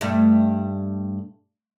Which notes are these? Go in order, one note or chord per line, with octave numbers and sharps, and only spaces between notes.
G2 A3